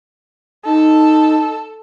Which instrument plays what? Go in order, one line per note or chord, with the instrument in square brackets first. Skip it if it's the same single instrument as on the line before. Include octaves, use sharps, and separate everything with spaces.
[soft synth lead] D#4 [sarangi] A4